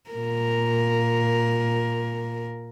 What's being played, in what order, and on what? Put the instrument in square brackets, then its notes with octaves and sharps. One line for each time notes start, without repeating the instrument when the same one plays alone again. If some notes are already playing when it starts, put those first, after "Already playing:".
[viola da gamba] A#2 A#4